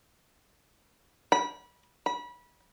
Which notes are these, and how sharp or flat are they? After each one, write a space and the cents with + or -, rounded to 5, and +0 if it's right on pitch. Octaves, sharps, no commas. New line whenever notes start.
B5 -25
B5 -25